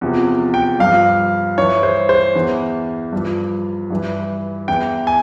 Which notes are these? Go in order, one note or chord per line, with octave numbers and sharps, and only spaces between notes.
E2 C3 F3
G5
G2 F3 F5
G2 E3 C#5
C5
C5
E2 E3
G2 F3
G2 E3
E2 E3 G5
G#5